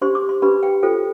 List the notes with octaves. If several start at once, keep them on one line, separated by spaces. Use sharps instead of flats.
D4 G4 C5 C6
D6
C6
D4 G4 B4 B5
G5
F4 A4 C5 G5